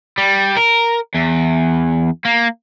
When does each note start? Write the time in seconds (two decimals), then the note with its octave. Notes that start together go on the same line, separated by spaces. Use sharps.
0.18 G3
0.57 A#4
1.15 E2
2.25 A#3